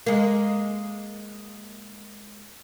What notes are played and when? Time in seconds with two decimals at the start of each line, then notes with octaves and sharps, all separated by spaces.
0.06 G#3 A#3